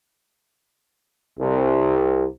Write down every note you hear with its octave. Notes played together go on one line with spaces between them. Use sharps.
C2